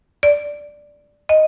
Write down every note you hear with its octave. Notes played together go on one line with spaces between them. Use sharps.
D5
D#5